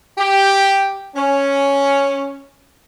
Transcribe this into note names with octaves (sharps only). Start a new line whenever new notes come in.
G4
C#4